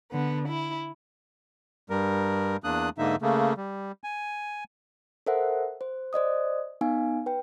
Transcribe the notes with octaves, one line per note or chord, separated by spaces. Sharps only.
D3 B3
E4
G2 G3 A#4
E2 A#3 D4 D#6 F#6
G#2 D3 A#3 D#4 E5
C#3 A3 A#3
G3
G#5
A4 A#4 C5 E5 F#5
C5
C5 D5 D#5 D#6
B3 D#4 F5 G#5
B4 G5